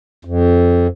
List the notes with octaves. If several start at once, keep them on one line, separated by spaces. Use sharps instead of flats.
F2